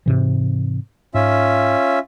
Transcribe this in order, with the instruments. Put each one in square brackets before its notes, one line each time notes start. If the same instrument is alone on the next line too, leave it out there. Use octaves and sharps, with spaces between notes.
[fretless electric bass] G#2 C3 E3
[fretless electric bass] G#2 [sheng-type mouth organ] C#4 F4 E5